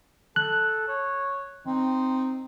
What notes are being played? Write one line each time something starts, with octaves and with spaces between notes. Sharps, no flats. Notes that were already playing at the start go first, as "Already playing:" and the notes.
A4 F#6
C#5
C4 D#4